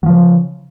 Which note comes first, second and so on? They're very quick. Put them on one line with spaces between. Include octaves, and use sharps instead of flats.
F#3 F3 C#3